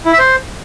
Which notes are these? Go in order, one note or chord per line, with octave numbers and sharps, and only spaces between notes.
E4
E5
C5